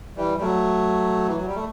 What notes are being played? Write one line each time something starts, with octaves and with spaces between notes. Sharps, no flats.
E3 G3
G3
F#3 A3
E3
F#3
G3
A3